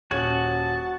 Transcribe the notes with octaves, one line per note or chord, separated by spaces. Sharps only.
D#1 C#4 F#4 C#5 A5 G#6 F#7